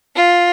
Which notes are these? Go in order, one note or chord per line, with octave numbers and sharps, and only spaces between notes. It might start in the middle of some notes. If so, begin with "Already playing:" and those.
F4